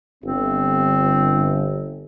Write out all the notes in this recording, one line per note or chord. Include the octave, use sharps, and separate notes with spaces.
G1 C4